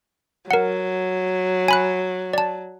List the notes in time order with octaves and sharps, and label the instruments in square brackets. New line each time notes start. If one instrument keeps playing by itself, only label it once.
[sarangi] F#3 [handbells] A#4 F#5
[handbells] G#5 B5 F#6
D5 A5